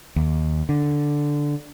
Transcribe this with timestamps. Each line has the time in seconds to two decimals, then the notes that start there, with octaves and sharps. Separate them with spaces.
0.16 D#2
0.69 D3